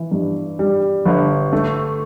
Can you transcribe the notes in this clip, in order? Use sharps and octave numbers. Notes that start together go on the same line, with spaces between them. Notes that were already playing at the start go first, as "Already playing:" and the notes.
Already playing: E3
G2
G3
G1
A3